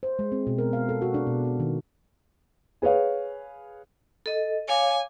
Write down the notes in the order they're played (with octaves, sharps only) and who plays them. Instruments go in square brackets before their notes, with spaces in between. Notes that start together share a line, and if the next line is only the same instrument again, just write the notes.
[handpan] C5
G#3
C4
B2
A#4
F5
A4
F#4
D4
B2
F#4
D#3
[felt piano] G#4 B4 C#5 F5
[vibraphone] A4 D#5
[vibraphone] C#5 F5 D6 [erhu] G#5